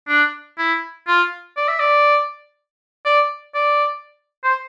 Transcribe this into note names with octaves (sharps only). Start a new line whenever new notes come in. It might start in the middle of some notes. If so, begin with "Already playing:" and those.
D4
E4
F4
D5
E5
D5
D5
D5
C5